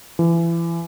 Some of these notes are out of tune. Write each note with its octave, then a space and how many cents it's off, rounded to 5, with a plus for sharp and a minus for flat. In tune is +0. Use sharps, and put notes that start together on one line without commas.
E3 +30